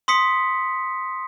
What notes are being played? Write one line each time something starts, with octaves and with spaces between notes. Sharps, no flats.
C6 D#6 B6 C#7